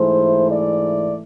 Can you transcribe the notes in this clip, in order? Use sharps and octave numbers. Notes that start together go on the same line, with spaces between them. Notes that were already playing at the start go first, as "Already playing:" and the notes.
Already playing: G#2 E3 A3 C5
D5